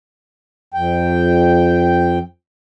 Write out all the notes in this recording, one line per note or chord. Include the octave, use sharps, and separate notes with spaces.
F2 G5